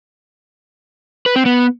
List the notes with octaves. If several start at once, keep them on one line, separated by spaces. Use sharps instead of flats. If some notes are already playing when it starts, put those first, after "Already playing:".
B4
C4
B3